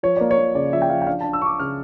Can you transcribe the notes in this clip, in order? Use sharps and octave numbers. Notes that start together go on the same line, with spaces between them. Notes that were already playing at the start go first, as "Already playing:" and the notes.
F3 C#5
A#3 D5
C#5
A#3
C#3 D5
F3 E5
G5
F3 F5
G5
D4 F5
A5
D4
E6
D4 C#6 D6
C#3 F6